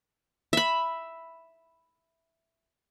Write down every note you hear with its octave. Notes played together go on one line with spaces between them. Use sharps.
E5 B5